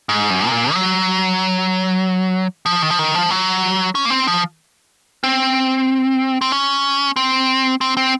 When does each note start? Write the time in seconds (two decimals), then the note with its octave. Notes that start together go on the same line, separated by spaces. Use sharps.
0.09 G#2
0.30 F#2
0.47 C3
0.51 A#2
0.73 F#3
2.66 F3
2.82 D#3
2.90 F3
2.99 D#3
3.15 F3
3.31 F#3
3.95 C#4
4.05 A#3
4.10 C4
4.27 F3
5.24 C4
6.41 C4
6.52 C#4
7.16 C4
7.81 C4
7.97 C4